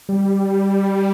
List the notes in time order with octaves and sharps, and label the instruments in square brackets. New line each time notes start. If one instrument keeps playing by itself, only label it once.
[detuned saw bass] G3